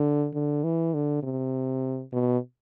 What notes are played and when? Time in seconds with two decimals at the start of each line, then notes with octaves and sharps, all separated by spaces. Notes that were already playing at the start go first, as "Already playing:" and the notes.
Already playing: D3
0.34 D3
0.64 E3
0.94 D3
1.23 C3
2.13 B2